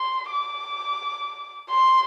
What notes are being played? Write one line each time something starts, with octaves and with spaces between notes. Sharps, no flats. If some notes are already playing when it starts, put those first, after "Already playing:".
Already playing: C6
D6
C6